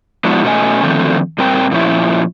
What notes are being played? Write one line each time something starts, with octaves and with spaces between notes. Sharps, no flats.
F3 G#3 B3 D4 E4 F#4
B2 A3 C#4 A4 D#5 G#5
D3 D#3 F3 A3 C4
A#2 G3 C4 A#4 G5
A#2 F3 C#4 E4